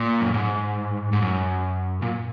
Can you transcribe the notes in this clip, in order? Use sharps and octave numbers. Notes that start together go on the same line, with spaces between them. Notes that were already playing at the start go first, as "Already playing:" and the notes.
Already playing: A#2
F#2
G#2
G#2
F#2
A#2